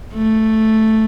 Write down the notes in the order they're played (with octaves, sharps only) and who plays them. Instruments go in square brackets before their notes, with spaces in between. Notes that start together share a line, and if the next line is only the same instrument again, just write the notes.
[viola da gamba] A3